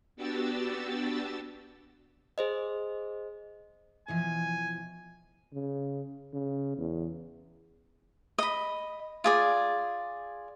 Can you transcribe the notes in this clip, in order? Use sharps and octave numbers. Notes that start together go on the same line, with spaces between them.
B3 D4 F#4 G4 E6 A6
G#4 C5 D#5
B2 E3 F3 G#5
C#3
C#3
E2
D#5 B5
F4 G#4 D5